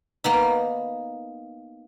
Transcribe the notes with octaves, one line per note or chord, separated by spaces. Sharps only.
A#3 B3 D#4